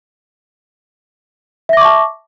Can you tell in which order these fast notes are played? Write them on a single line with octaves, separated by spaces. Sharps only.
E5 A#6 D6 C#6 A5